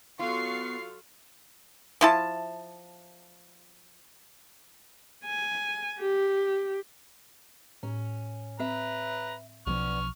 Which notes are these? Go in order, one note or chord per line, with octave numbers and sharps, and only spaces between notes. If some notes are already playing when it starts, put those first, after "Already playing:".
F#3 B3 F4 A4 F5 C#6 C7
F3 E4 A5
G#5
G4
A2 C#4
C4 B4 E5 A#5
B1 F3 B3 D5 C#6 F6